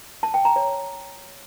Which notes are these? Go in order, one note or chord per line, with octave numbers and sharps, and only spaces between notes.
A5
G5
A#5
C#5